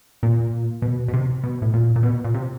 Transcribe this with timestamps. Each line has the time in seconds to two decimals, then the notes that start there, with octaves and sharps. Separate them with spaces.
0.23 A#2
0.82 B2
1.08 B2
1.13 C3
1.44 B2
1.62 A2
1.74 A#2
1.96 A#2
2.03 B2
2.24 A#2
2.35 C3